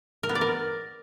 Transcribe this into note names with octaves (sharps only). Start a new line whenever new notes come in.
A#4
B3
D5
A#4